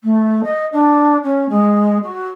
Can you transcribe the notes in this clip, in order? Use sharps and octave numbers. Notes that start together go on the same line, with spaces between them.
A3
D#5
D4
C#4
G#3
F#4